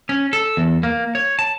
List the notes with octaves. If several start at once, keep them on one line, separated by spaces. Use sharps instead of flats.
C#4
A4
E2
A#3
C#5
A5